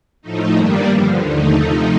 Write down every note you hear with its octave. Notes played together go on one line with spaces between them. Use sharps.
A2 F3 A3 D#4
G2 D#3 G3 A#3 D4
G2 D3 F3
D#2 D3 A3 D#4
C3 F3 A3 D#4